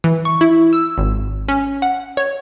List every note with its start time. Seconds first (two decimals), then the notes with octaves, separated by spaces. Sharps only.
0.04 E3
0.25 C#6
0.41 E4
0.73 E6
0.97 G#1
1.48 C#4
1.82 F#5
2.17 C#5